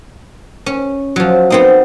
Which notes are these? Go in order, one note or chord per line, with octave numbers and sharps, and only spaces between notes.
C#4
F3 F#3
B3 C4 D#4